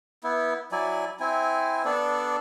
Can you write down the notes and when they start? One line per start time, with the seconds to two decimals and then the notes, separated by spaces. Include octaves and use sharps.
0.24 B3 E4
0.72 F#3 E4 D5 G#5
1.20 C4 E4 G#5
1.85 B3 D4 A4 D5